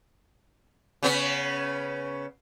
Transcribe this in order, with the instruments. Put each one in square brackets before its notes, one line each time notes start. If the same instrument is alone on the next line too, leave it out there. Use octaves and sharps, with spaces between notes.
[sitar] C#3 B3 C#4